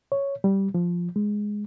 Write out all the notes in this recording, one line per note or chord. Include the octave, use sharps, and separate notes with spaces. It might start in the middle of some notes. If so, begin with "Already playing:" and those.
C#5
G3
F3
G#3